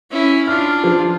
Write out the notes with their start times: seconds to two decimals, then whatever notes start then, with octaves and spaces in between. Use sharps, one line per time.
0.10 C#4 E4
0.47 D4 F4 F6
0.84 F3